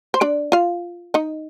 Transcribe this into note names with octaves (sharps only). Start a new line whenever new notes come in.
C5
D4 D5
F4 F5
D#4 D#5